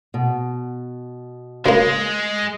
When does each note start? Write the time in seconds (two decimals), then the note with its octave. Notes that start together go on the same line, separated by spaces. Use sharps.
0.14 B2
1.66 C#2 G#3 A#3